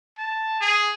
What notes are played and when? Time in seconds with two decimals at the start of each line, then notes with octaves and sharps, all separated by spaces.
0.19 A5
0.61 G#4